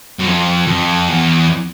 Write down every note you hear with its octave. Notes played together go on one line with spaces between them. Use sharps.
F#2
F2
F2
E2